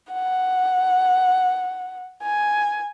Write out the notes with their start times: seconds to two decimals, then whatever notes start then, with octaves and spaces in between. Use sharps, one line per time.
0.13 F#5
2.23 G#5